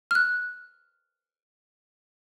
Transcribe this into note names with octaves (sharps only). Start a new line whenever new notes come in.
F6 F#6